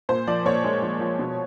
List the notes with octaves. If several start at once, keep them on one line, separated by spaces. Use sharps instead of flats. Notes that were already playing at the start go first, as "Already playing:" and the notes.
A#2 C5
F3 D5
A#2 C#5
G#3
F3
F3
B2